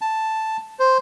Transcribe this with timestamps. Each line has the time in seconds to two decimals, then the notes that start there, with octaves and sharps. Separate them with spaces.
0.01 A5
0.79 C5